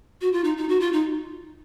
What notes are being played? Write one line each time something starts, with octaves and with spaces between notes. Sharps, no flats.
F#4
F4
D#4
D#4
F#4
F4
D#4